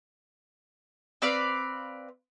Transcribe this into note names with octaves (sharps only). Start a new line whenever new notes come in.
C4 B4 D5 F5